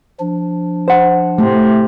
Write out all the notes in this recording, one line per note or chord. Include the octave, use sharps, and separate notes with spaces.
F3 D4
C5 F#5
A2 C3 A3